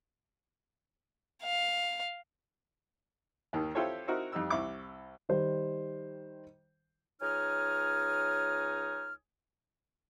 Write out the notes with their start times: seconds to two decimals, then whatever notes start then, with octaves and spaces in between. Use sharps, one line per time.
1.43 F5
3.53 D#2 D#3
3.75 C4 E4 F4 G4 A4 C#5
4.07 C4 D#4 E4 F#4 A#4
4.32 F2 G3 D#4 E6
4.50 C2 E4 C#6 D6
5.29 D#3 G3 C5
7.21 C#2 D#4 C#5 G#5 D#6 F6